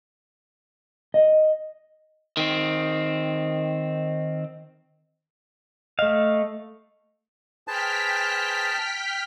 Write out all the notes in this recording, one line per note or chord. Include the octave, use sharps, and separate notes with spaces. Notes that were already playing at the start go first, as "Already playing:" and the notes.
D#5
D#3 C4
A3 D#5 F5
G#4 B4 C5 G5 A5 F6 B6